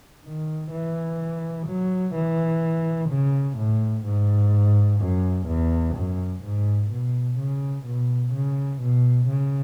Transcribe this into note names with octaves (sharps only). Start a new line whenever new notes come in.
D#3
E3
F#3
E3
C#3
A2
G#2
F#2
E2
F#2
G#2
B2
C#3
B2
C#3
B2
C#3